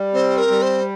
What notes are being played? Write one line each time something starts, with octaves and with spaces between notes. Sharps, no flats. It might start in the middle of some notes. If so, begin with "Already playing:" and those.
Already playing: G3
C4 C5
A#4
G3
C5